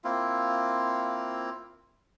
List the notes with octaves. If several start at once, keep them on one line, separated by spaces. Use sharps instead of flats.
A#3 C4 E4 F4